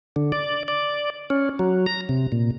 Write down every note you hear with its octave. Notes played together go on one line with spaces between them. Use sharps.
D3
D5
D5
C#4
F#3
A#5
C3
A#2